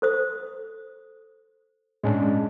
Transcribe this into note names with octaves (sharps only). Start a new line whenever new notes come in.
A4 C5 D#6
A2 G#3 C#4 D4